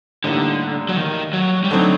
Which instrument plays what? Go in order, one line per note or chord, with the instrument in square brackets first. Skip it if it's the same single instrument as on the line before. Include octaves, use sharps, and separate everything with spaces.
[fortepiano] A2 G3 A#3 D#4 [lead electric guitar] D3
[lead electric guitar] F#3
D#3
F#3
G3
[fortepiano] D3 A3 C4 D#4 [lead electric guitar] F#3